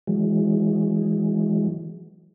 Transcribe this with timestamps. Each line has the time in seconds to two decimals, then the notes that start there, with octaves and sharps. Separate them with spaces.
0.07 E3 F#3 G#3